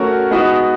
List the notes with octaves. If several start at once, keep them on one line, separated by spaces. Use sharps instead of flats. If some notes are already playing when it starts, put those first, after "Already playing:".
Already playing: A3 C#4 F#4 A#4 C#5
G#3 B3 D#4 F#4